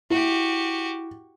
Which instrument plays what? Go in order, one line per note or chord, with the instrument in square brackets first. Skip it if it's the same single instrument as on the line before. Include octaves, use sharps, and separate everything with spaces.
[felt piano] E4 [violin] F#4 G4